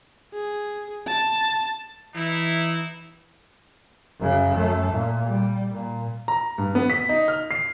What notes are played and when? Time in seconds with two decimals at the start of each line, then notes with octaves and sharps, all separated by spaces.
0.34 G#4
1.07 A5
2.15 E3 D#4 E4
4.20 F#2 C#3
4.54 F#2 A3
4.91 A#2
5.26 G3
5.71 A#2
6.28 A#5
6.58 G2
6.75 B3
6.90 B6
7.09 D#4
7.28 F6
7.51 C7